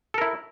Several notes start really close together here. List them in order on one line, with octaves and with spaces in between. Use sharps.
A4 A#4 E4